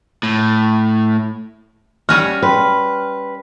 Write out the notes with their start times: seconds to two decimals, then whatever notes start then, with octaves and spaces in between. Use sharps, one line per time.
0.23 A2
2.09 G3 C#4 F#4 F6
2.42 B4 G5 B5 C6